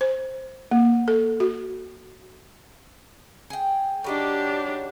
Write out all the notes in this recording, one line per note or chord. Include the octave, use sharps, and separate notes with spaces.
C5
A#3
A4
F#4
G#4 G5
C#3 F#3 D4 D#4 G4